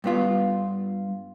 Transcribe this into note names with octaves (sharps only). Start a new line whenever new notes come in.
G2 B3 F4